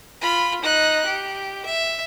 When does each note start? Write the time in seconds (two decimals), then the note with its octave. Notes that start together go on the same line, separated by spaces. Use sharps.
0.21 F4 B5
0.61 D#4 F#6
1.06 G4
1.65 E5